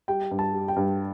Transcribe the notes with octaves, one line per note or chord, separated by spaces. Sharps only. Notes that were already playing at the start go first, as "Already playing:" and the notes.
G3 G5
G2
A5
G3
G5
G2